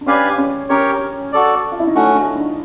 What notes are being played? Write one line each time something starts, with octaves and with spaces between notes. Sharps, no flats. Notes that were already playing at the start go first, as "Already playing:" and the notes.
D4
C#4 G4 B4 D5 F5 G#5
C#4
C#4 G4 A#4 C#5
F#4 A4 D5
F4
E4
D#4
A3 C#4 D4 F#4
D4
D4